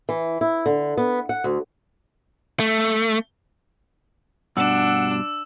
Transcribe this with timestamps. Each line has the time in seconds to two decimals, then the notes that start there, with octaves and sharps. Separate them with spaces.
0.09 E3
0.41 E4
0.66 D3
0.97 B3
1.29 F#5
1.44 D2
2.60 A3
4.57 G2 B2 D4 F#5 E6 E7